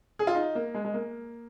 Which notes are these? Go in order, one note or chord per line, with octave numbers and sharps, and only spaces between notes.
G#4
F4
D#4
A#3
G#3
G#3
A#3